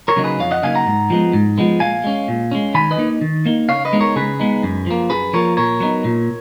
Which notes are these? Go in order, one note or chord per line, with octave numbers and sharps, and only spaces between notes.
A#4 C#5
C#3 F#3 A#3 D#4
G#4 B4
F2 C#5 F5
D#5 F#5
C#3 F#3 A#3 D#4 F5 G#5
F#5 A#5
G#2
F3 G#3 B3
G#2
F3 G#3 B3
A#2 F5 G#5
G#3 C#4
A#2
G#3 C#4
D#3 G#5 B5
B4 D#5
A#3 D#4
D#3
A#3 D#4
C#3 C#5 F5
B4 D#5
G#3 B3 D#4
A#4 C#5
C#3 G#4 B4
G#3 B3 D#4
F#2
F3 A#3
F#2 G#4 B4
F3 A#3 A#4 C#5
A#2 A#4 C#5
F#3 B3 D#4
A#2